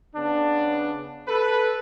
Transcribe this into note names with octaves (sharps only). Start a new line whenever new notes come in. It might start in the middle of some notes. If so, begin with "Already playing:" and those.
C#3 B3 D4
A4 B4